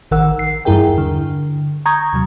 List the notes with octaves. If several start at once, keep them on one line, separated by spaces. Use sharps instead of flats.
A1 D#3 A#4 F#5 E6
C7
E2 G2 E4 G#4 A#4 G5
D3
A#5 C#6 D#6 G6 G#6
D#2 C3 F#3